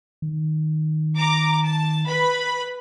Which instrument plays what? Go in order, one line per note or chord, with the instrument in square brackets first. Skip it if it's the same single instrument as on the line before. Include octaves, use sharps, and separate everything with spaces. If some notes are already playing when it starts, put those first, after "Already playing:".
[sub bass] D#3
[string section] A#5 D6
A5
B4 B5